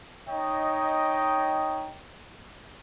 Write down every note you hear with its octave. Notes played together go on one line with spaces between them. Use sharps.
D#4 C#5 D#5 G5